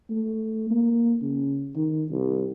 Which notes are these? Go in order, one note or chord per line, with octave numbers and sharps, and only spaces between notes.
A3
A#3
C#3
D#3
C2